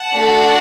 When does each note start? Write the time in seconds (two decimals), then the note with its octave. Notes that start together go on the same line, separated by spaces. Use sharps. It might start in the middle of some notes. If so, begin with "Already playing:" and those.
Already playing: F#5 A5
0.12 A3 D4 F#4 A4